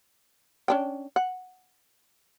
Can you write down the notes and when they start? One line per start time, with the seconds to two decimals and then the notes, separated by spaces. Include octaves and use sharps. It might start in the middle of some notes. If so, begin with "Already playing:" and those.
0.68 C#4 D4 G5
1.16 F#5